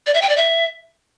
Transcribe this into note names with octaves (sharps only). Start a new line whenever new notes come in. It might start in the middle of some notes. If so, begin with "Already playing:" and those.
D5
E5
G5
D5
E5